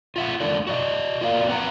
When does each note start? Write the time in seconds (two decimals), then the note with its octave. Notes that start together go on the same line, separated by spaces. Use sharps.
0.16 F4 E5 F#5
0.40 G#3 D4 D#4 A4 D5
0.67 F#4 D5 D#5
1.21 F4 F#4 A#4 D5 F5
1.48 C4 B4 F#5 A#5